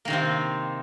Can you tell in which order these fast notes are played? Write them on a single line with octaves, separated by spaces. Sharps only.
A#3 D#3 C3 C4